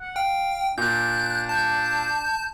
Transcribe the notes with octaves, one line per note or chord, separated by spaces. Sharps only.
F#5
F5 G5
A#2 D4 F#6 G6
A5 G6